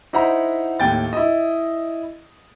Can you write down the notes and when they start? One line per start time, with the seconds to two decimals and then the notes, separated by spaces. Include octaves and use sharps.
0.13 D#4 E4 C5 F#5 A#5 B5
0.80 D#2 A2 G5 A6
1.13 E4 D#5